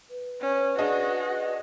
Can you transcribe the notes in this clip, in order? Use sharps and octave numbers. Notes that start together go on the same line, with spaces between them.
B4
C#4
D4 F#4 G#4 D#5